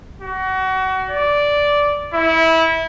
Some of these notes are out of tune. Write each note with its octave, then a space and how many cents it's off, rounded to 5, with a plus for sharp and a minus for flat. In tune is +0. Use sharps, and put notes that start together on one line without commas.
F#4 +30
D5 -10
E4 -20